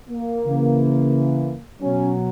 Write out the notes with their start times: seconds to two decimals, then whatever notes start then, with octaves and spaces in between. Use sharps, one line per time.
0.10 A#3
0.44 C#3 E3
1.82 B2 F#3 C#4